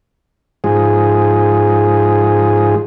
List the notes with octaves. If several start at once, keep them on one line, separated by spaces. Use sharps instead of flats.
G#2 F3 G#4